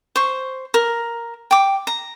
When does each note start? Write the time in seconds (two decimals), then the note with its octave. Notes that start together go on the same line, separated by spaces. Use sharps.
0.16 C5 C#6
0.74 A#4
1.51 G5 D6
1.87 A#5